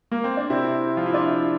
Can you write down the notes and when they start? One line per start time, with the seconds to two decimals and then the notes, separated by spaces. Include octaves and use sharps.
0.11 A#3
0.24 C4
0.37 D4
0.50 C3 C4 E4
0.97 F3 F4
1.06 E4
1.14 D4 F4